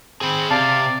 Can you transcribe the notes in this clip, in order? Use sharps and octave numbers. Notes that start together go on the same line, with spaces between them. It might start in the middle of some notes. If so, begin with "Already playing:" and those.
C4 G#4 B5
C3 D5 F5 A5